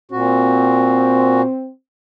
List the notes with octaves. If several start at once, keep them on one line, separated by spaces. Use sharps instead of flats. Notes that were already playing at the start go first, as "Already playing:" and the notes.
A#2 C4 F#4